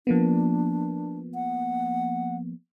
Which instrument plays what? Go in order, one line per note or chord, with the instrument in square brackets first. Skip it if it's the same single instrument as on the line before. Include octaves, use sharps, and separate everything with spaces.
[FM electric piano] F3 A#3 B3 [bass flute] D4
[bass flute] F#5